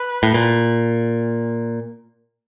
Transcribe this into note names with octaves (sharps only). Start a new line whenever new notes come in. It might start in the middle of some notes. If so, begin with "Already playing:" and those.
Already playing: B4
A2
A#2